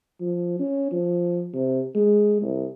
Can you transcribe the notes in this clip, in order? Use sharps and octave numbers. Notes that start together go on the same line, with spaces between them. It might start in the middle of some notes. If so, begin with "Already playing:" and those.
F3
C#4
F3
C3
G#3
C2